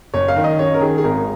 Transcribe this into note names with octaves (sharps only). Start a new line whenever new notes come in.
F#1 C#5
F5
D#3
D#5
F#2 C#5
A#4
D#3 G#4
G#4
G#1 A#4